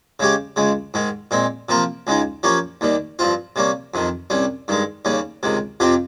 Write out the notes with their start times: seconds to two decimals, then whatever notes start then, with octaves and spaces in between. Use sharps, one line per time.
0.20 C#3 G#3 C#4 G4
0.56 C#2 C#3 G#3
0.94 G#2 D#3 G#3
1.31 A#2 G#3 C4
1.69 C3 F3 A#3 F4 A#4
2.07 C#2 C#3 G#3 D#4
2.43 F3 A#3 C#4 G4 C#5
2.81 D#2 D#3 G3
3.19 G2 F3 C4 F4
3.56 C3 G3 A#3 C#4
3.94 F2 C3 D#3
4.30 C2 C3 G3 C#4
4.68 G2 D#3 G#3
5.05 D#2 C#3 G3 C#4
5.43 C#2 C3 D#3
5.80 F2 C3 F3 C4 G4